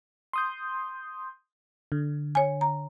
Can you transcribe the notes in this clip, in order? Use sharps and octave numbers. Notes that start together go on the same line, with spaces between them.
C6 D#6 G6
D3
C#5 G#5
A#5